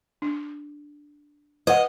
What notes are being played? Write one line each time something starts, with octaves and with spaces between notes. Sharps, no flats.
D4
B4 D#5 F#5